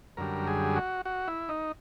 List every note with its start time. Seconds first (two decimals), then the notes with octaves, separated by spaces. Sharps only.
0.17 F#2 D3 G3 A#4
0.47 G#4
0.76 F#4
1.05 F#4
1.28 E4
1.49 D#4